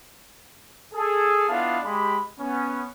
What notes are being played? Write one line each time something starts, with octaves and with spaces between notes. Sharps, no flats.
G#4 A4
B3 D4 E4 F4 D#5 F5
G#3 G4 B5
B3 C#4